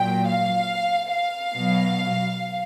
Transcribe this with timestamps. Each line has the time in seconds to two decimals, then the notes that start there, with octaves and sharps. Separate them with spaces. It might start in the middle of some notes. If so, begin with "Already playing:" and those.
Already playing: A#2 F#3 G5
0.27 F5
1.11 F5
1.53 B2 F#3